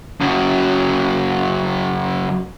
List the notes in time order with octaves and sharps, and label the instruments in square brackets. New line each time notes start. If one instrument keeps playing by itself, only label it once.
[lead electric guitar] F#2 C#3